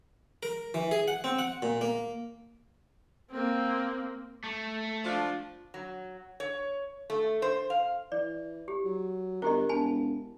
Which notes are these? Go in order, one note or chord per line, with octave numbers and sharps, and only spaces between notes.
A#4
E3
G#4
F#5
C4
F#5
A#2
A#3
A#3 C4
A3
F3 D4 F4
F#3
C#5
A3
C5
F5
E3 D5
G4
F#3
G1 E4 G4 A#4 D#5
E1 G#5 A5 B5